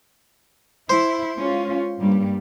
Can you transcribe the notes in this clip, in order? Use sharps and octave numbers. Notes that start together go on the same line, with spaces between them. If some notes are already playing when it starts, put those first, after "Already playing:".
E4 C5
G#3 C#4 F4
G2 G3 A#3